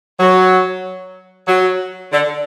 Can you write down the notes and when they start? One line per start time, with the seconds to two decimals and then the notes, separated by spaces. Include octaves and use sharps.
0.20 F#3
1.48 F#3
2.12 D3